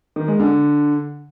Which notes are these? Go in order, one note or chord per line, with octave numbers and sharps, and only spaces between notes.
D#3
G#3
D3